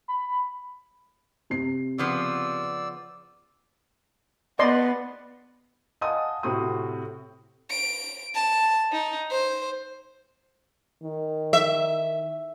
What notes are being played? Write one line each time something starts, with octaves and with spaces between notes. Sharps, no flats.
B5
C3 C7
C#3 F3 B3 D5 E6
B3 D5 D#5 C6
D#5 F5 F#5 G#5 A5 D#6
A2 C3 C4 F#4 D#6
D7
A5
D#4
C5
D#3
E5